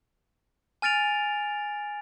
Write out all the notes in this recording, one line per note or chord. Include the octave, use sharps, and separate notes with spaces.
G#5 F6 A6 D7 F7